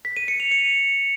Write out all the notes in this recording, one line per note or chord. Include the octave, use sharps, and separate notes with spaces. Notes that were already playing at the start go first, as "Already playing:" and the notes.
B6
D#7
C#7
F7
C#7